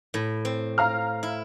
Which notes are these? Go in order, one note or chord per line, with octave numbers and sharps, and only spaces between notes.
A2
C4
F5 A#5 F6
E4